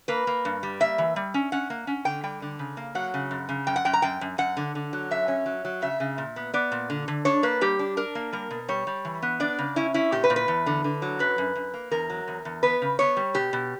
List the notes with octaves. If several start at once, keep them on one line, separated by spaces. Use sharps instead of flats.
A#3 B4
A#3
G2
G3
A#3 E5
E3
G3
C#4
C#4 F#5
A#3
C#4
D3 G5
G3 G5
D3
C#3
A#3
F#3 F#5
C#3
F#2
C#3
F#2 G5
F#5
F#2 G5
A#5
F#2 G5
F#2
F#2 F#5
D3
D3
F#3
F#2 E5
C#4
F#3
F#3
C#3 E5
C#3
A#2
B3
B3 D5
A#2
D3
D3
D4 C#5
A#3 B4
G3 G4
D4
D4 A#4
A#3
G3 A#4
B2
G3 C#5
G3
E3
B3
D4 D5
C#3
C#4 E4
C#4 E4
A#2 G4
B4
A#2
B4
E2
D3
D3
F#3
F#2 B4
F#2
F#2
A#3
E2 A#4
F#3
E2
E2
B3 B4
C#3
B3 C#5
G3
B2 G4
B2